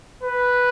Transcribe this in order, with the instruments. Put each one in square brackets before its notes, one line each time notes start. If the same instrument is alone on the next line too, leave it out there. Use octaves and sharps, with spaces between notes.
[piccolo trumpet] B4